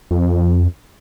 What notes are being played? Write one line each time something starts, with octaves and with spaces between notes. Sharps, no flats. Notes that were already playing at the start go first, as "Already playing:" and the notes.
F2